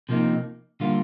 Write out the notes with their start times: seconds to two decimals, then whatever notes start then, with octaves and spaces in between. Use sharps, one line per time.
0.09 C3 F3 A#3 D#4
0.80 D3 G3 A#3 F4